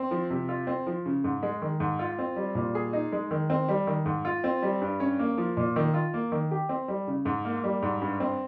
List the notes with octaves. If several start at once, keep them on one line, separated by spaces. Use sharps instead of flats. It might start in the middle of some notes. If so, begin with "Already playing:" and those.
Already playing: C4
F3
C3
F4
C4
F3
C#3
G#2
G#3
D#3
G#2
F4
C4
G3
A#2
G#4
D#4
G#3
D#3
C4
G3
D#3
G#2
F4
C4
G3
G2
C#4
A#3
F3
A#2
D#3
F4
A#3
D#3
G4
C4
G3
C#3
G#2
A#3
G3
G#2
G2
C4